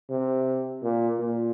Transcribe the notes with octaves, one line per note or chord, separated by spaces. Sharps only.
C3
A#2
A#2